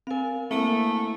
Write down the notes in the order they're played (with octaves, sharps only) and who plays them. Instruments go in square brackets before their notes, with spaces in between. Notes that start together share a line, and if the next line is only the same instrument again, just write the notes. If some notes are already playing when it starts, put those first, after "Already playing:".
[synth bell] C4 A#4 [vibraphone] F5 G#5
[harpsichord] D2 A#3 D#6 [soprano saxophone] A3 [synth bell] C4 [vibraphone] E4